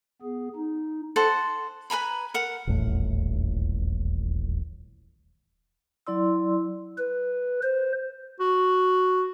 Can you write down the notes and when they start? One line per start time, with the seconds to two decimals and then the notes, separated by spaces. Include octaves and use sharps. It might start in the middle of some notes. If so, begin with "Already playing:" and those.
0.22 B3 G#4
0.56 D#4
1.16 A4 C5 F#5
1.90 B4 G#5 A#5 B5
2.34 A#4 F#5
2.67 D#1 A1 E2 A2
6.07 F#3 E4 D5 C6 E6
6.98 B4
7.63 C5
8.40 F#4